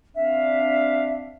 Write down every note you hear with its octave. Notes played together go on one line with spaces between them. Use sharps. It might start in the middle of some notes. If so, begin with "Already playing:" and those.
C4 D4 E5 F5